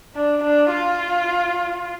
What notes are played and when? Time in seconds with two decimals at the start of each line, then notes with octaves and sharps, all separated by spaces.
0.16 D4
0.43 D4
0.72 F4